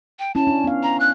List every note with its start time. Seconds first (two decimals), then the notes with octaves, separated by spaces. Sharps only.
0.19 G5
0.35 C#4 E4 A5
0.47 D4
0.64 B3 F5
0.83 A#5
1.00 F#6